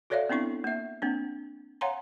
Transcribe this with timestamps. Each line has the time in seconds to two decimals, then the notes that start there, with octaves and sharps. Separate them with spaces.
0.10 F#4 A4 C#5 D5 E5 F5
0.29 B3 C4 D4 E4 C#6
0.64 A#3 E5
1.02 A#3 C4 D4
1.81 C#5 F5 F#5 G#5 A#5 C6